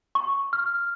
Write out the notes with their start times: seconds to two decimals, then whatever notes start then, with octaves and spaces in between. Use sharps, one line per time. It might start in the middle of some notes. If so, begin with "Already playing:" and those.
0.15 C#6
0.53 F6